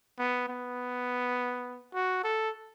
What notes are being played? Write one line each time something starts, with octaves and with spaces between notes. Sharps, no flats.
B3
B3
F#4
A4